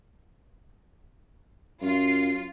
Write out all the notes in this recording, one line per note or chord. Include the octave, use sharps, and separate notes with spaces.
F#2 F4 C7